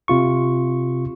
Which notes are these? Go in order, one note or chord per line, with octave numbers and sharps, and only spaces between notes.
C3 F4 C#6